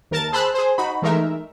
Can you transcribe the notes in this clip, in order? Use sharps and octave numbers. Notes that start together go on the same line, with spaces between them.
D#2 A#4 A5 A6
G#4 C5 A5 B5 E6 F#6
G#4 C5
D#4 F#4 B5
E3 G#3 A3 D#4 A#4 E5